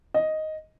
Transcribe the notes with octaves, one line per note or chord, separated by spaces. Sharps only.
D#5